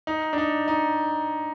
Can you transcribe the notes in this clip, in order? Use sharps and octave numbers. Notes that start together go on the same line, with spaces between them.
D#4
D4
D#4
D#4